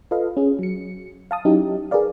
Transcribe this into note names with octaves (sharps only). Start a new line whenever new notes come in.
F4 A4 B4 D#5 F5
C#4 G#4
F#3 C#7
F5 A5 D#6
F#3 C#4 D#4 E4 G4
G#4 A#4 B4 D5 F5